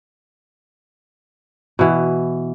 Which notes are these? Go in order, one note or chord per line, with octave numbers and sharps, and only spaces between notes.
B2 E3